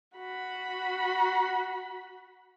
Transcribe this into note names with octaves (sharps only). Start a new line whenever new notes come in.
F#4 B5